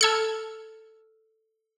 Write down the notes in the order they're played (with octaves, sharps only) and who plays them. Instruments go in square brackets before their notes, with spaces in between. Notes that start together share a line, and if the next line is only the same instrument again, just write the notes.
[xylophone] A4 E6 F6 [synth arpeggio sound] A5 G#6 C#7